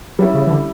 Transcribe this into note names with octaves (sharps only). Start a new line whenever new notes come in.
F#3 G3 C#4 E4
C#3
E3
D3